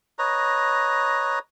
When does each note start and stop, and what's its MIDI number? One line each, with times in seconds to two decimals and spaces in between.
0.19 1.39 71
0.19 1.39 73
0.19 1.39 75
0.19 1.39 82